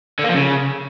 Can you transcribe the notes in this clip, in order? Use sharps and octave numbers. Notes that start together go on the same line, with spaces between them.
D3
A#3
F3
C#3